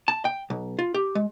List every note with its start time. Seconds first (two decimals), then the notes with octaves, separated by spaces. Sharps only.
0.08 A5
0.25 G5
0.50 B1
0.79 F4
0.94 G4
1.15 G#3